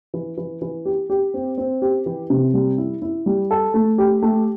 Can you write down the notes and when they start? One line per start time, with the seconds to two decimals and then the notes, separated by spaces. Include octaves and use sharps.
0.14 E3
0.37 E3
0.62 E3
0.85 G4
1.10 G4
1.34 C4
1.58 C4
1.82 G4
2.06 E3
2.30 C3
2.54 G3
2.78 E4
3.02 E4
3.26 G3
3.51 A4
3.74 A3
3.98 G4
4.22 A3